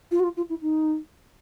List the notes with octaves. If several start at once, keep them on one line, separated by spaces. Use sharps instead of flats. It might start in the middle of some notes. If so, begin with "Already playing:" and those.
F4
F#4
F4
F4
E4
D#4